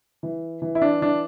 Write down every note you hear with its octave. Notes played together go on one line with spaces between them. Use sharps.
E3
E3
E4
D4
E3 D4